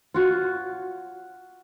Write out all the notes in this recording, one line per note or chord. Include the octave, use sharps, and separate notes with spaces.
F4 F#4 C#5